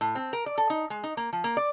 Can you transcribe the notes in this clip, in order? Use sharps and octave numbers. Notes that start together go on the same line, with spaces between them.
A2
C4
A#4
D5
A4
D#4
G#3
D#4
A#3
F3
A#3
D5